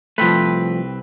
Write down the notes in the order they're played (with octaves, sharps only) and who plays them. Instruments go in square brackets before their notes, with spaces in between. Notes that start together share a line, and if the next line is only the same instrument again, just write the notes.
[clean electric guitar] C2 C4 B4 [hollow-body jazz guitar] F3 A3